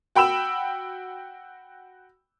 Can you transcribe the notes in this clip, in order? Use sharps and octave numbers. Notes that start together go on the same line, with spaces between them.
F#4 G5 B5 E6 E7